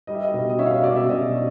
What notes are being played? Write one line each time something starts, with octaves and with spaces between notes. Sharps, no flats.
G3 D#5
E5
D#5
B2
D#5
C#4 E5
F5
E5
B2 D5
E5
B2 D#5
C#4